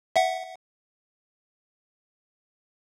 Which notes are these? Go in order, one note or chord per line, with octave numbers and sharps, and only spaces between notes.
E5 F#5